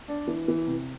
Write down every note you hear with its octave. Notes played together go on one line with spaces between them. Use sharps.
D4
E3
E3
C3